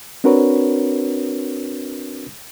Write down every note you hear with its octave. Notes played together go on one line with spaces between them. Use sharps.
C4 D4 F#4 A#4 B4 C#5